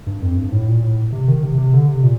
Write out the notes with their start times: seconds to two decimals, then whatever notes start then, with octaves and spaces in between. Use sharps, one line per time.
0.07 G2
0.22 F2
0.37 G2
0.52 A2
0.67 A#2
0.83 A2
1.13 C3
1.28 D#3
1.43 C3
1.58 C3
1.73 D3
1.88 C3
2.03 A#2